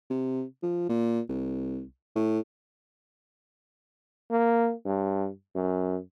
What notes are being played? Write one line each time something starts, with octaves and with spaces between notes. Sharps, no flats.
C3
F3
A#2
C2
A2
A#3
G2
F#2